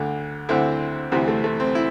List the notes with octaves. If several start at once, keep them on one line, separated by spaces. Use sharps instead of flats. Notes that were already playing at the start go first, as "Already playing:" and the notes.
Already playing: D2 D3
D2 D3 C4 E4
D2 C3 E3 C4
A3
A3
C4
E4